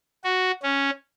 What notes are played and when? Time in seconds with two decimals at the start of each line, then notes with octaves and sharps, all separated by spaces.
0.24 F#4
0.63 C#4